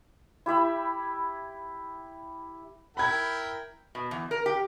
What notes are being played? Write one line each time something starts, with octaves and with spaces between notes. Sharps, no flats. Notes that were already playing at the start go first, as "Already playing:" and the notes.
E4 G4 E5 B5
E4 A#4 G5 B5 G#6
B2
E2
A#4
G4